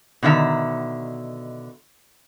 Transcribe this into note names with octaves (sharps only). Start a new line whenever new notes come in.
B2 D3 D#3 E5 A#5